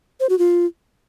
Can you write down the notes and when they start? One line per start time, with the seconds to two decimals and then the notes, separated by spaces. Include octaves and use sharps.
0.20 C5
0.29 F#4
0.39 F4